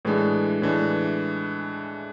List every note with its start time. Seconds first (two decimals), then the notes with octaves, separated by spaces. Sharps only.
0.05 A2 E3 G#3 D4
0.62 A2 E3 G#3 D4